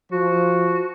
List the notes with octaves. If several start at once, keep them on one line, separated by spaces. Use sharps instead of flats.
F3 F#4